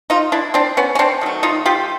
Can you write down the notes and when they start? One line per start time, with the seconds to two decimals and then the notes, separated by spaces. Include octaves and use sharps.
0.10 D#4 F4
0.32 D4 E4
0.54 C4 D4
0.77 B3 C#4
0.95 C#4
0.99 C4 D4
1.21 D#3 F#3 A3
1.43 D#4 F4
1.66 F4 G4